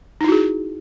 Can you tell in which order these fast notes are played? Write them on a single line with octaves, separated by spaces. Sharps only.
D#4 E4 F#4 G#4